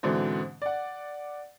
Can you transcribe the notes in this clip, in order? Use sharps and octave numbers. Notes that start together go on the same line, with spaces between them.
G#2 B2 D3 E3 C4
D5 F#5